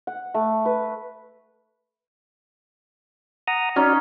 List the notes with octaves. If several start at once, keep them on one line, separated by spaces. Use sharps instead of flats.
F#5
A3
B4
F#5 A#5 D#6
C#4 D#4 F#4 D5